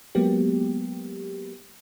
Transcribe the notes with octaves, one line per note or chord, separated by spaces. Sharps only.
F#3 G#3 A#3 B3 G4